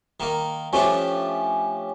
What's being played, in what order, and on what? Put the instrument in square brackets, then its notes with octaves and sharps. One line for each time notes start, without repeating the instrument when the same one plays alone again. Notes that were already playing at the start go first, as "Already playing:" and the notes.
[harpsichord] D#3 A#3
[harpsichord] F3 A3 D4 [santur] C#4 G4